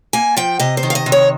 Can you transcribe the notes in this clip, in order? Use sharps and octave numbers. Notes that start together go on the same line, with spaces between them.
A#3 G#5
F3 G5
C3 D#5
C5
D#3
F5
D#5
C3
C#5